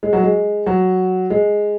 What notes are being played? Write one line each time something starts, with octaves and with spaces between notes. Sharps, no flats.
G#3
F#3
G#3
F#3
G#3